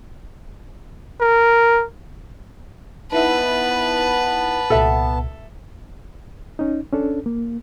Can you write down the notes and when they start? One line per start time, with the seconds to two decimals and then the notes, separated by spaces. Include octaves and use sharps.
1.21 A#4
3.12 B3 D#4 E4 B4 E5 A5
4.70 C2 A#2 A4 E5
6.59 C#4 D#4
6.93 C#4 D4 A4
7.26 A#3